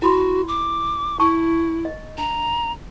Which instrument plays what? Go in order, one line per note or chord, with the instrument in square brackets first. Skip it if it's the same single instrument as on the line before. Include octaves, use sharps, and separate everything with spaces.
[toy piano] E4 B5 C6 [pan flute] F#4
[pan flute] D6
[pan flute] E4 [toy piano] A5 C#6
[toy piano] D#5
[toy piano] D4 [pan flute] A#5